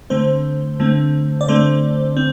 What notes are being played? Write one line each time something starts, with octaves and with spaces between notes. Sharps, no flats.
D3 A3 C4 C5
D3 A3 C4
D5
D3 A3 C4 C5
C4